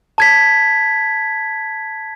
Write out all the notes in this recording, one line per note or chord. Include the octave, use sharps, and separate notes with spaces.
A5 G#6 B6